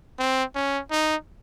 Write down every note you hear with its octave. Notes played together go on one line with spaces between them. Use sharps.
C4
C#4
D#4